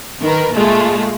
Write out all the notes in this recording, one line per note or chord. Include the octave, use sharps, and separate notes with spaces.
D#3 A#4 B4
A#2 G#3 A3 F4